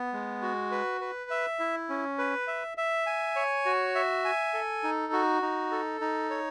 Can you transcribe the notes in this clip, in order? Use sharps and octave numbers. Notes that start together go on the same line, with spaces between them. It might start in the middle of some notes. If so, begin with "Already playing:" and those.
Already playing: B3
G#3
F#4
B4
B4
E5
E4
C#4
B4
E5
E5
G#5
C#5
F#4
E5
G#5
A4
D#4
F#4
D#4
A4
D#4
C#5